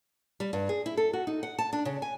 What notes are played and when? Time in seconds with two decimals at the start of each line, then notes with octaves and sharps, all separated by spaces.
0.40 G3
0.53 G2
0.69 G#4
0.86 E4
0.97 A4
1.13 F#4
1.27 D#4
1.43 F#5
1.59 A5
1.73 D4
1.85 C#3
2.02 G#5